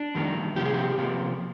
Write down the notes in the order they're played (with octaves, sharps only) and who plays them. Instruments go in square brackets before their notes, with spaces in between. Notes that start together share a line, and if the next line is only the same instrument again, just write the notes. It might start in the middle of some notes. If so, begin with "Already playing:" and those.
Already playing: [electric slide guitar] D4
F2 D#3 G3 A#3
C3 F3 A#3 G4
G#4
G4
C3 F3 A#3